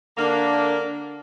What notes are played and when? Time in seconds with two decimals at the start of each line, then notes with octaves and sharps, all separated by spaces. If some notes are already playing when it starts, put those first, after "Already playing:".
0.16 D3 A#3 D4